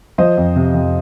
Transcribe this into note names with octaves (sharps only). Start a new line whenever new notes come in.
F3 C5 D#5
F2
C3
F2